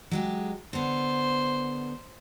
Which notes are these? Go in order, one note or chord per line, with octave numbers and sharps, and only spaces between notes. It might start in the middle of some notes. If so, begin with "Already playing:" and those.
F#3 G#3 G4
D3 B3 C5